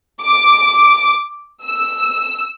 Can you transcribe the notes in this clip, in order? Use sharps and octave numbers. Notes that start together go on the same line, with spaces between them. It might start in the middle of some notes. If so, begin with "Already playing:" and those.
D6
E6